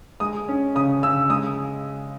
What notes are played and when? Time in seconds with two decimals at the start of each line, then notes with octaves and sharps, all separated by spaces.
0.20 G#3 D#6
0.48 C#4
0.75 C#3 D#6
1.03 C#3 E6
1.30 G#3 D#6